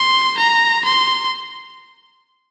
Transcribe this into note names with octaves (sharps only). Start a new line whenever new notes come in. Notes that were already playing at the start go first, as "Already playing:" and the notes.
Already playing: C6
A#5
C6